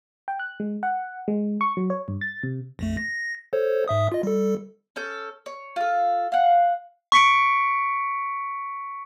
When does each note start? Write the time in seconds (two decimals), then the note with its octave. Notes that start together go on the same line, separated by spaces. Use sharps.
0.28 G5
0.39 F#6
0.60 G#3
0.83 F#5
1.28 G#3
1.61 C#6
1.77 F#3
1.90 C#5
2.08 G2
2.21 A6
2.43 C3
2.79 A#1 F2 A3
2.97 A#6
3.53 A4 C5 C#5
3.88 G#2 E5 D#6
4.12 F4 D#5
4.23 G3 A4
4.96 C#4 A4 G6
5.46 C#5
5.76 F4 A4
6.32 F5 F#5
7.12 C#6 B6 C#7 D7